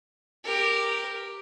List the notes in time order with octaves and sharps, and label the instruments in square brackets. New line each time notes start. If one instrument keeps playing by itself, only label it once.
[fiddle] G4 A#4